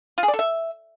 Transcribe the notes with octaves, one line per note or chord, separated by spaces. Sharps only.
F4
G#4
D5
A4
E5